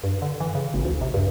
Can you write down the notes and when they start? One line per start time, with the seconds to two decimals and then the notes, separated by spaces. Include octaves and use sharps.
0.04 G2
0.22 D3
0.40 E3
0.55 C#3
0.74 G#1
0.85 D2
1.01 C3
1.14 G2